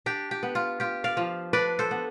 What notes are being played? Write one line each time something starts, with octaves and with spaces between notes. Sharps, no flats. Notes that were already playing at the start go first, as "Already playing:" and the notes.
D4 G4
G4
B3
F4
F4 G4
D5 F5
F3
D4 B4 D5
A4 C5
B3